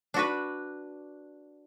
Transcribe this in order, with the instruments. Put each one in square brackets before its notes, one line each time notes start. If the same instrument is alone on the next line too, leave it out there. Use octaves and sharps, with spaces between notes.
[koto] D4 F#4 B4